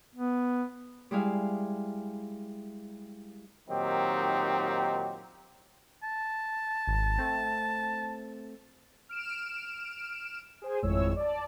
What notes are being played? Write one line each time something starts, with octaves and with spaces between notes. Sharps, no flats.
B3
G3 G#3 E4 F5
A#2 D#3 F#3 C4 D#4 G4
A5
G#1
A3 C4
F6 D7 E7
G#4 C5 G#5
G#1 F2 A2 G#3 C#5 E6
D5 A5